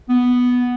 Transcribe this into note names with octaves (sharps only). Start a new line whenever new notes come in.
B3